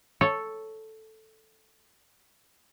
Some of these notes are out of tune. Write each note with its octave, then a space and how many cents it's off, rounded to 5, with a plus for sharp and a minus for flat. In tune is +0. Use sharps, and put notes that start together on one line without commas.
A4 +0 C#5 +0